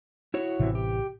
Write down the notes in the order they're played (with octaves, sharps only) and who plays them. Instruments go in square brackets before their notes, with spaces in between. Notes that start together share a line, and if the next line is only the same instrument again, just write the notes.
[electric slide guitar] E4 F#4 C#5
[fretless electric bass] A1 C3 E3
[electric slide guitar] G4